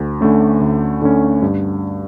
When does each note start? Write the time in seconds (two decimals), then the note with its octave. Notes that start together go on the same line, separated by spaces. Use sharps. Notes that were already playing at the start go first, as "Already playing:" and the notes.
Already playing: D2
0.21 D3 A3 C#4
0.61 D2
1.02 D3 A3 C#4
1.42 G2